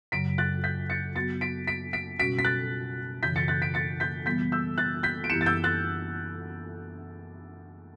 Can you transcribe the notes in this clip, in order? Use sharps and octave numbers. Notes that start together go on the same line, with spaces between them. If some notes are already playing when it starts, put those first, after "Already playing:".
F#2 C#3 F#3 B6 D7
F#6 A6
G6 B6
A6 C#7
F#3 B3 F#4 A6 C#7
B6 D7
B6 D7
B6 D7
B2 G3 C#4 F#4 B6 D7
B6
F#6 A6
F#2 C#3 E3 G6 B6
A6 C#7
F#6 A6
B6 D7
A6 C#7
G6 B6
E3 G3 B3 G6 B6
E6 G6
F#6 A6
G6 B6
D7
F#2 E3 B3 E4 G4 C#7 E7
A6
E6 G6
F#6 A6